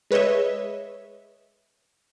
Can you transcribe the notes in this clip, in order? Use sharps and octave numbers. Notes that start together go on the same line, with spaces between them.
G#3 B4 C#5 D#5 E5